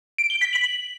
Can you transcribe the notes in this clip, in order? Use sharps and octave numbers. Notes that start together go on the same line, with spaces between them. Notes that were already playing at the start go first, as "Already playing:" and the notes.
D7
G7
B6
F#7